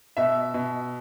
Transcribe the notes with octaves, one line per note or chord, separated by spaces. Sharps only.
B2 E5
B2